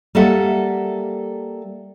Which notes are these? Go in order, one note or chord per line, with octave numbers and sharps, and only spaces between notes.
G3 A#3 A4 E5 F#5